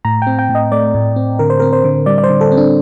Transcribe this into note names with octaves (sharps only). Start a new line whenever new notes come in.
A2 A#5
C4 G5
G5
A2
D#5
A3 D5
A2
C4
D3 A#4
C5
C4 A#4
C5
D3
G3 D5
D5
C5
D3
A4
C4
D4